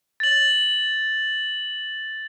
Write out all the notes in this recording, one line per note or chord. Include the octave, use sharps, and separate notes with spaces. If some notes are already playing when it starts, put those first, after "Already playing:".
A6 F#7